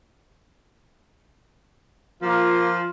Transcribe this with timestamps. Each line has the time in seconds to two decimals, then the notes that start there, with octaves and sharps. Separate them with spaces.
2.22 F3 A#3 F4